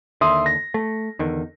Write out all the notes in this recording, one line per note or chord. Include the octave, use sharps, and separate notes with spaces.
D#2 D3 E5 C6 D#6
A#6
A3
E2 D3 D#3